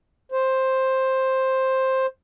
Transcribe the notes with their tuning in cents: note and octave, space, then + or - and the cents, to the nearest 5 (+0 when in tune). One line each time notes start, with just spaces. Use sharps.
C5 +10